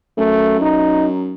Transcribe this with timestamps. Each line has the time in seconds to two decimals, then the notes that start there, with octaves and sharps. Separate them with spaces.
0.18 F#2 A3
0.61 D#4